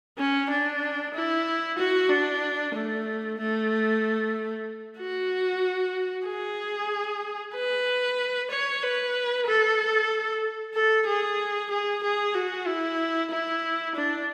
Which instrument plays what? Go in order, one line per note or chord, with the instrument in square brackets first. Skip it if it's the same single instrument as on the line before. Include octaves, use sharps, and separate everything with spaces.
[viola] C#4
D4
E4
F#4
D4
A3
A3
F#4
G#4
B4
C#5
B4
A4
A4
G#4
G#4
G#4
F#4
E4
E4
D4